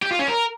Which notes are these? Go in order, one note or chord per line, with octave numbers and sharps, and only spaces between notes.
G4
F4
C#4
A#4